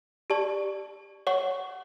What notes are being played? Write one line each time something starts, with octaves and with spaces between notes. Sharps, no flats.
G4 D5 A5 C#6
C#5 F#5 C#6